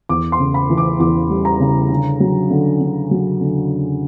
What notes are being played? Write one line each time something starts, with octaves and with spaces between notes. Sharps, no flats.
E2 D6
C6
C#3
B5
E3
D6
E2 D6
G3
A#5
C#3
D3
F#3
D3
D3
F#3
D3